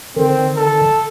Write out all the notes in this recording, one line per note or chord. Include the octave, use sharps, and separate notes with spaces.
D3 D#3 C4
A4